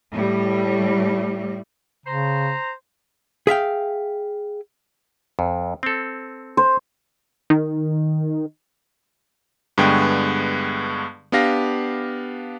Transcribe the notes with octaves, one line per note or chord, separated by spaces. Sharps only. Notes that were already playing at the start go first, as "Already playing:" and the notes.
A2 G3
C#3 C5 A#5
G#4 E5 F5 G5
F2
C4 A4
C5
D#3
G2 D3 G#3 B3 G5 C#6
B3 D4 G4 F5 A#6